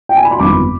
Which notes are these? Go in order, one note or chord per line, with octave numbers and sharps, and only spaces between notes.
G5
G#5
B5
C6
G1 F2 D#3 G#3 B3 B5 D6